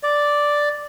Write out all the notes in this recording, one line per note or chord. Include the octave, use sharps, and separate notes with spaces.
D5